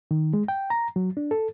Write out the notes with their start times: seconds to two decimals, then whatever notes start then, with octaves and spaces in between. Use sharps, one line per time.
0.11 D#3
0.33 G#3
0.48 G5
0.70 A#5
0.96 F#3
1.17 D4
1.31 A4